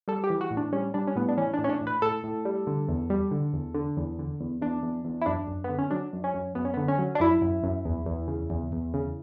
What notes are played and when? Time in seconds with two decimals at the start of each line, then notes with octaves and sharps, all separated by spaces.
0.08 G3 A4
0.24 G4
0.30 E3
0.41 F#4
0.51 A2
0.57 D4
0.73 G3 C#4
0.94 G3 D4
1.07 C#4
1.16 A2 B3
1.28 D4
1.37 E3 C#4
1.54 D4
1.59 A2
1.64 C#4
1.69 D4
1.81 A2
1.87 B4
2.02 A2 A4
2.24 A2
2.45 G3
2.67 D3
2.89 E2
3.10 G3
3.31 D3
3.53 E2
3.74 D3
3.97 E2
4.19 D3
4.40 E2
4.62 E2 D4
4.83 E2
5.05 E2
5.21 E4
5.26 F#2 D4
5.48 F#2
5.64 B3
5.69 D3
5.79 C#4
5.91 F#3 D4
6.13 F#2
6.24 C#4
6.34 F#2
6.55 F#2 B3
6.65 C#4
6.74 D3 B3
6.88 C#4
6.98 F#3
7.15 D4
7.20 F#2 E4
7.42 F#2
7.63 F#2
7.85 E2
8.06 E2
8.28 C#3
8.50 E2
8.72 E2
8.94 C#3